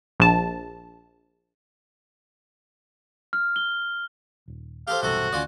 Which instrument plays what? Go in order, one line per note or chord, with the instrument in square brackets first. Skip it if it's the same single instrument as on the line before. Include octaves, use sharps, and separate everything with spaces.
[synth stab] A#1 A5
[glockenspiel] F6
G7
[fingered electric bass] D#1
[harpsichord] G4 A4 C5 [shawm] F5
[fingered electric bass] B1 E2 G2 [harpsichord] C3 A4 [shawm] F#4
[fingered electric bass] D2 [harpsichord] C#4 F4 D5